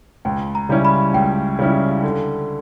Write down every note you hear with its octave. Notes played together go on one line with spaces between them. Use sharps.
C#2 G5
A#5
C#3 G3 C#4 E4
B5
C#2 G5
C#3 G3 C#4 E4
D3